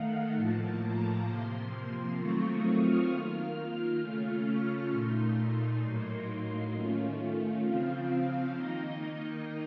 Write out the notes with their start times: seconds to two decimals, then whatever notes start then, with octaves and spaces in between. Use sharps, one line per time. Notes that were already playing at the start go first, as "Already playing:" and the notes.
Already playing: D#3 A3 D#4 F5 F#5
0.36 A2 F3 A#3 A5
0.82 A#5
1.27 C3 F3 A#3 C6
2.18 D#3 F#3 A3 C4 F4 C#6
2.48 D#6
2.79 F6
3.09 D#3 A#3 F4 F6
4.00 C#3 A3 C#4 F4 F6
4.46 C#6
4.91 A#2 A3 D#4 C6
5.83 A2 F#3 A#3 D#4
6.74 D#3 A3 C#4 F4
7.64 C#3 F3 C4 F4 F5
8.55 D#3 A#3 D#4 D#5